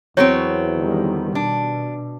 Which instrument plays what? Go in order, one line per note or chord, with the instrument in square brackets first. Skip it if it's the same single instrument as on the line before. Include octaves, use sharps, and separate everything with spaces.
[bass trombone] E2 [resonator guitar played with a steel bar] F#3 B3 C4 [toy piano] C#5
[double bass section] D3 D#3 G3
[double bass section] B2 [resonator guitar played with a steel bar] D4